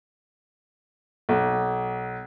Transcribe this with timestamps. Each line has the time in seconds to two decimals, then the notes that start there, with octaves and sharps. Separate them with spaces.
1.29 B1